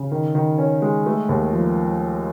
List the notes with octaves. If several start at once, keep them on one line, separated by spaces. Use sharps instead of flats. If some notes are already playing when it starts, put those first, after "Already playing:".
Already playing: C#3
D#3
D#3
C#4
G#3
A3
D#2
F3